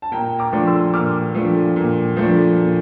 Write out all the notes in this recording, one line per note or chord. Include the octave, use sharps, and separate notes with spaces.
A5
A#2 G5 A#5
A#5 D6
F3 A3 D4
C6 E6
A#2 D6 F6
F3 A3 D4
A#2
F3 A3 D4
A#2